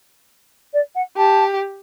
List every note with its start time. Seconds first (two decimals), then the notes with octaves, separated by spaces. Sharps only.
0.73 D5
0.95 F#5
1.17 G4 A5